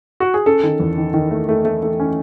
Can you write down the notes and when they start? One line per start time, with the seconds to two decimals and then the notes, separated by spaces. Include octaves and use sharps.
0.20 F#4
0.34 G#4
0.46 C#4 A4
0.63 D#3
0.80 E2
0.98 D#3
1.14 D#3
1.31 A3
1.49 A3
1.65 A3
1.83 A3
2.00 C#4